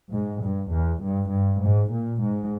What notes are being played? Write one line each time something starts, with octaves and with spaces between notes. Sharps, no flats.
G#2
G2
E2
G2
G2
G#2
A#2
G#2